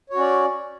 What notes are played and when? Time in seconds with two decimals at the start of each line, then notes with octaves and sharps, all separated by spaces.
0.10 C#5
0.13 F#4
0.17 C#4
0.20 D5